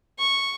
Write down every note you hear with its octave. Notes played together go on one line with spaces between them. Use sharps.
C#6